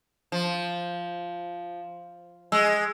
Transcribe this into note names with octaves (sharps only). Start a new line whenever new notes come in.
F3
G#3 E6